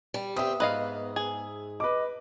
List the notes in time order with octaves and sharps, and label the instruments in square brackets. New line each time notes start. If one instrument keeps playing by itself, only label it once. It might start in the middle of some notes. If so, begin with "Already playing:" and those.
[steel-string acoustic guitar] G3
[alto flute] B3 [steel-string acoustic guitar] C4 G4 [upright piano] E5 D#6
[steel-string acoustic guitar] G#2 [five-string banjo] B4 D#5 F5
[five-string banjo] G#4
[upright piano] B4 D6 [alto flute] D#5